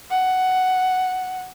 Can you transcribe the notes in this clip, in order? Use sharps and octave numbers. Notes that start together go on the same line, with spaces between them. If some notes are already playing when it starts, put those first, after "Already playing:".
F#5